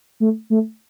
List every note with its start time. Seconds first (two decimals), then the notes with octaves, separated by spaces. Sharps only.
0.20 A3
0.50 A3